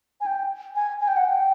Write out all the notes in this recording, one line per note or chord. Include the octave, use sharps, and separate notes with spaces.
G#5
G5
G#5
G#5
G5
F#5
G5